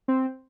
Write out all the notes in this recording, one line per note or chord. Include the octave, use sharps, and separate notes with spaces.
C4